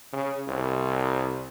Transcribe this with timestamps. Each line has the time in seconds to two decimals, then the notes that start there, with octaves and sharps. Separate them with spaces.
0.13 C#3
0.48 C2